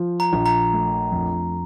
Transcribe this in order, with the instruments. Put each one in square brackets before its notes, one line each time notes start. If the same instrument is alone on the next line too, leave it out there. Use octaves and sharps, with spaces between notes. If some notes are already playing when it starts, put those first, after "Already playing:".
Already playing: [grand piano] F3
[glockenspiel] A#5
[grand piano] A#1
[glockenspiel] A#5
[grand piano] A3
F2